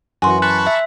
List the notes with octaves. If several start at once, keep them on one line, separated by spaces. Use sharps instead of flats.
F#2 E3 F#4 G#5 C6
A5 B5 C#6 F#6
E5